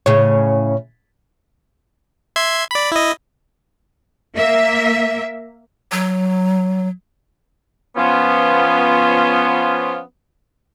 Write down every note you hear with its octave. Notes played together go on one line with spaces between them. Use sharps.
A2 C#3 C#5
E5 C6 G#6
D5 B5
E4 D#5
A#3 E5
F#3
F3 B3 C#4 F4